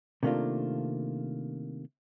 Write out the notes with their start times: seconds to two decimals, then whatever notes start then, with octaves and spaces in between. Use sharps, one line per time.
0.23 C3 D#3 A3 A#3 D4 F4